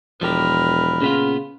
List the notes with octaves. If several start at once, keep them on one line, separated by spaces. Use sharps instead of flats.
E1 F3 G4 A#4 B4
A#2 C#3 B3 F4